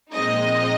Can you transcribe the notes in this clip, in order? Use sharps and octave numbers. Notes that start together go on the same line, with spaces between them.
A#2 F3 G#3 C4 D#4 D#5